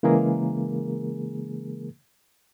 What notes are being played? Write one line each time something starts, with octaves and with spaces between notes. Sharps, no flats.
C#3 E3 G#3 A#3 G#4 A#4